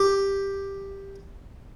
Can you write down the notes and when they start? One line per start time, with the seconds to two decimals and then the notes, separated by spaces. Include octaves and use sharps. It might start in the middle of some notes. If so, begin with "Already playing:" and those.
Already playing: G4